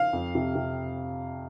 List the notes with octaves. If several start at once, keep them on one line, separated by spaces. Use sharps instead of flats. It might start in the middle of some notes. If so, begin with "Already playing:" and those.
Already playing: F5
F2
C3
C3